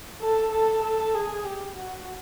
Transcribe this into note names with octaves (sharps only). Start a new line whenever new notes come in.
A4
A4
A4
G#4
G4
F#4